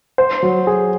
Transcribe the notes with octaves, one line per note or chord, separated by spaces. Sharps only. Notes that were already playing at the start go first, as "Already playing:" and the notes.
C5
F#3
G#4